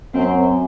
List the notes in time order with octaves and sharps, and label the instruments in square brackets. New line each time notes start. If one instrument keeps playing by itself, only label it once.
[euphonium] F#2 [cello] C4